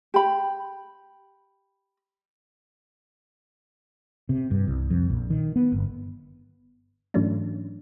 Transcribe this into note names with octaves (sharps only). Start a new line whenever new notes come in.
G4 B5
C3
G2
C2
F2
A#1
D#3
B3
G1
G#2 E3 F#3 A3 C#4 D4